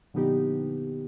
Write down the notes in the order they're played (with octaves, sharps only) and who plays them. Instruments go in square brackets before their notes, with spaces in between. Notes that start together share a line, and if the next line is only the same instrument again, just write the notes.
[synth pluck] A#2 D3 F3 B3 D#4 G4